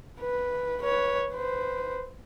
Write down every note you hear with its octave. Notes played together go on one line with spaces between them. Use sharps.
B4
B4 C#5
B4 C5